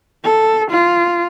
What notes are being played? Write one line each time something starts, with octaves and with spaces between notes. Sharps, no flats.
A4
F4